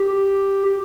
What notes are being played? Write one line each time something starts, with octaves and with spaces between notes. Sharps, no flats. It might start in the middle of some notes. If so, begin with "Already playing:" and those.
Already playing: G4
G4